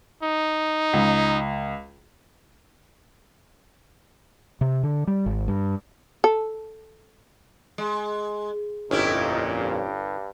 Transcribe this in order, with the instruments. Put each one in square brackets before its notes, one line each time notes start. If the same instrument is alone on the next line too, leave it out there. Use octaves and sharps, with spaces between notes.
[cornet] D#4
[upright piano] C#2
[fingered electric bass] C3
D3
G3
G#1
G2
[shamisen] A4
[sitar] G#3
[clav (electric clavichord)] G1 [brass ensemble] F2 A#2 [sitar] C#4 E4 G4 [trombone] D#4
[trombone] G2